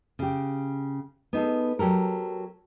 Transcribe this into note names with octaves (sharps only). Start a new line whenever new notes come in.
C#3 G4
B3 D#4 G#4 A4
F#3 G4 A4 A#4